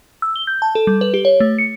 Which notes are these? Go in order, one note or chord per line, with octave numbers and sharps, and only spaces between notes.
E6
G7
G6
A5
A4
G3
B4
G4
C#5
A3
C#7